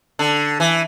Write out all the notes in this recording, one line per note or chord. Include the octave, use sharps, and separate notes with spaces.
D3
E3